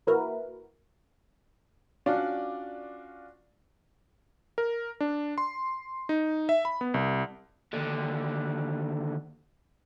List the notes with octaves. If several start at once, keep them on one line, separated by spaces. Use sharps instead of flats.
A1 A#3 E4 F#4 A#4 B4
C#4 D4 F4 F#4 D5
A#4
D4
C6
D#4
E5
B5
B3
C2
D#2 D3